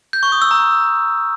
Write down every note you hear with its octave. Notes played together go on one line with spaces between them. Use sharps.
G6
C#6
D#6
E6
A#5